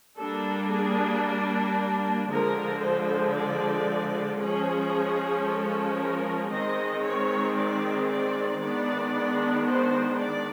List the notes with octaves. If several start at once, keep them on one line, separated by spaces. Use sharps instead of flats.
G3 A#3 D4 A4
G#4
D3 F3 G#3 A#4
C5
D5
F3 G#3 C#4 G#4
A4
A#4
D#3 G#3 C4 D#5
C#5
D5
D5
D#3 G#3 B3 D4 D5
C5
D5